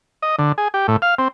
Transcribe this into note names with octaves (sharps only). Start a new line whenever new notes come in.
D#5
D3
G#4
G4
A2
F5
C4